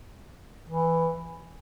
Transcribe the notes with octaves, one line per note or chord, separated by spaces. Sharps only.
E3